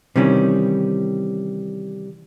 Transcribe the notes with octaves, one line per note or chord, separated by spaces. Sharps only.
C3 D#3 E3 G3 C#4